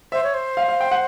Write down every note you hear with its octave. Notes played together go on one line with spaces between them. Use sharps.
C5 E5
C#5
C5
F5
F5
G5
F#5